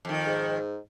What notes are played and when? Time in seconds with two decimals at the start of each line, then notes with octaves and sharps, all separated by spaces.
0.05 F2 D#3
0.27 G#2